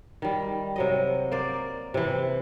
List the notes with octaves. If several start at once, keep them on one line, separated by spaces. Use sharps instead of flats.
D#3 G3
C3 F#3 D#5
A#3 C5 D5
C3 E3